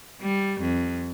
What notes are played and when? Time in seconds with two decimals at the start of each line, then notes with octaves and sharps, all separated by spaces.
0.21 G3
0.60 F2